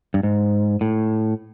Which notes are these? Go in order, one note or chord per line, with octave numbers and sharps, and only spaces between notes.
G2
G#2
A2